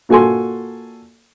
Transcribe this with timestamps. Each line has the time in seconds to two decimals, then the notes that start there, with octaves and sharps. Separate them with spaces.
0.09 A#2 F#4 A4 G#5 C6